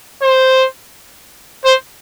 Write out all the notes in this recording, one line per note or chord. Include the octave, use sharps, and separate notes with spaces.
C5
C5